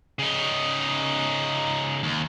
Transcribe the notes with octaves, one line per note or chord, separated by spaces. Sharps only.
C#3 D#4
D#2